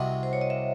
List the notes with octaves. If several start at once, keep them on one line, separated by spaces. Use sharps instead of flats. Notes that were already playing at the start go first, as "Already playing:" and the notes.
Already playing: C2 C3 F#3 D#5 F#5
C5
C#5
D#5
E5